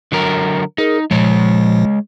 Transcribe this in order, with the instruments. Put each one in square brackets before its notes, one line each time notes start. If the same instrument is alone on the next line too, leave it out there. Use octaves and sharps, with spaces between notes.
[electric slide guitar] D3 F#3 A#4
[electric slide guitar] D#4 [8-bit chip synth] G#4 A#4
[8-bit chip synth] A#2 F3 [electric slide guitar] G#3 C#5